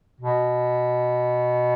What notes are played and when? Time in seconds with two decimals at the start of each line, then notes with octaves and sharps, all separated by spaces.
0.20 B2